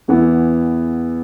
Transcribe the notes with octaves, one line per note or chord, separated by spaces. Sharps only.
E2 E3 B3 E4